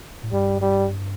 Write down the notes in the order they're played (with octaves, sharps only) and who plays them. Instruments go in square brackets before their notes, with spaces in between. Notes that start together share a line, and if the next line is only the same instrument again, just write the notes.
[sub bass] A2
[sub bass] G2 [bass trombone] G3
[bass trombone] G3